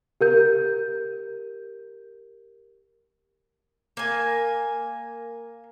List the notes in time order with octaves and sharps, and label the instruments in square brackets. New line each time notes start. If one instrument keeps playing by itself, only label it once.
[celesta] G4 A#4 G6
[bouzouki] A#3 G#5